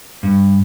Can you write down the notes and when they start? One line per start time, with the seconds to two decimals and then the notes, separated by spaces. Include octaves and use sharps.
0.23 G2